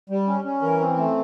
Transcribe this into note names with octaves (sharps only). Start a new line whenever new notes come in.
G3
C#4
C#4
E3 A#4
C4
A3